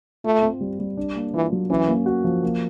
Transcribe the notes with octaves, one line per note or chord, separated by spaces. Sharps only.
A3 F4
C4
G3
G3
D4
A#3
E3 F4
F#3
E3 C#4
A#3
F#4
F3
A#3